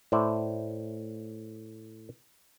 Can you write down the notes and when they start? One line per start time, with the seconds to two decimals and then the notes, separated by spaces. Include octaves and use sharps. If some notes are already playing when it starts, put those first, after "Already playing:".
0.12 A2 C5 D5 E5